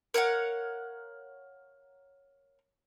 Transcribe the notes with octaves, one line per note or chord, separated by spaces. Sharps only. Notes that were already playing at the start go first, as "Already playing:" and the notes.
A#4 C#5 F5 F#5